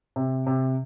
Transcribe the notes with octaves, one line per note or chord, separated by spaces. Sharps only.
C3
C3